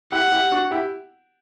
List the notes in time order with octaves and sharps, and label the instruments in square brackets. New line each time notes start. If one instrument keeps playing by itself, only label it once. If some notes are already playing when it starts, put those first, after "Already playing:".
[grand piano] E4 G4 [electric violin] F#5
[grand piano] E4 G4
D4 F#4
E4 G4